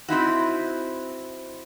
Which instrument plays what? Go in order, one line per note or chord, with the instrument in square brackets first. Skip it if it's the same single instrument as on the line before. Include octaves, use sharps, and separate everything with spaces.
[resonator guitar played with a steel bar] C4 D#4 E4 F#4